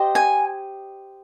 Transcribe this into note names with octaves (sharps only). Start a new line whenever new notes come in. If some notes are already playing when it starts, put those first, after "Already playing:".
Already playing: G4 C5 D#5
G#5